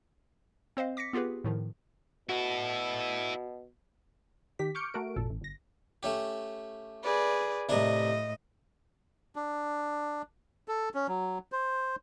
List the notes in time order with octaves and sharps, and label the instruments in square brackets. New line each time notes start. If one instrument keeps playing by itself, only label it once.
[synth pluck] C4 C5 D#5 F5
D6 A#6 B6 C#7
B3 F4 G4 G#4 B4
A2 D#3 F3
[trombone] B2 [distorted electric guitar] E4 A4 [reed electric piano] F#4
[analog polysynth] D#3 G4 B6
C#6 D6 F6 G6 C#7 D7
A3 F#4 A#4 D7
G#1 F2 A#2 A4
A1
G1 A#6
[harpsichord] A3 C#4 G4
[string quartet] G#4 B4 D5
[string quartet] A2 D#5 [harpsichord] C3 D4 A#4
[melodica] D4
A4
C#4
F#3
C5